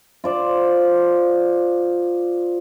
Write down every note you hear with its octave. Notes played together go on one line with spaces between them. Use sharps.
F4 C5 D5